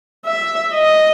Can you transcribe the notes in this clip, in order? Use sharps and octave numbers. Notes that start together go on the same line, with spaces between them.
E5
D#5